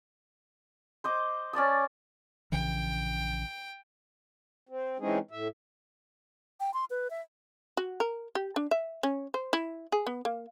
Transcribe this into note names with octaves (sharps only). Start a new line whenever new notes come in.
C5 D#5 D6
C#4 D5 A5 D#6
A#1 C#3 E3 G5
C4
E3 G#3 C4 C#4 D#4 G#4
A2 E5
G5
C6
B4
E5
F#4
A#4
G4
D4
E5
C#4
C5
E4
G#4
B3
A#3